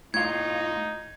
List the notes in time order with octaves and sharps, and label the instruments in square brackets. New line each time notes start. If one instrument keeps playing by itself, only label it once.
[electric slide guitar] A2 F4 [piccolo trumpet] D#4 [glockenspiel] G#6